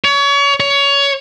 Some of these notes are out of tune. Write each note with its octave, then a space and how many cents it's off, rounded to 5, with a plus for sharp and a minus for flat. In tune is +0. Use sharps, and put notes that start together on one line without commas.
C#5 +30
C#5 +20